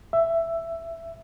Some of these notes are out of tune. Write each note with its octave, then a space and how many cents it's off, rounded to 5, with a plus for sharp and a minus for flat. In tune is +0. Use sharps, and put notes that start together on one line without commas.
E5 +10